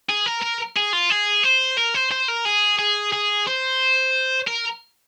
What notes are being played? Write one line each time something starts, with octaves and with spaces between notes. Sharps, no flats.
G#4
A#4
A#4
G#4
F4
G#4
C5
A#4
C5
C5
A#4
G#4
G#4
G#4
C5
A#4